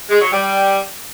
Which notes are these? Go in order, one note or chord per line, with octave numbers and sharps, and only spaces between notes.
G#3
F#3
G3